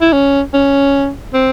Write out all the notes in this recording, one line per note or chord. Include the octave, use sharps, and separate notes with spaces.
E4
C#4
C#4
C4